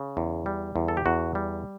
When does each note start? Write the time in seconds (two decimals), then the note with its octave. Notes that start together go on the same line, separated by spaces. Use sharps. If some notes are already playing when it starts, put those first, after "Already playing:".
Already playing: C#3
0.17 E2
0.46 G3
0.76 E2
0.88 A4
0.97 G4
1.06 E2 F#4
1.35 G3